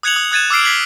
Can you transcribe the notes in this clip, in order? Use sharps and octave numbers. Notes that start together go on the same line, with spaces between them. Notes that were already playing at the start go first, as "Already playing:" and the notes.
D#6 F#6 G#6 C#7 F7 F#7
D#6
D#6 F#6 G#6 A6 D#7 E7
D6 E6 F6 C7 D7
G#6 B6 C7 F#7